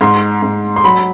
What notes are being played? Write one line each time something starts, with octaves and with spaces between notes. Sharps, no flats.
G#2 C6
G#2
C6
F#3 B5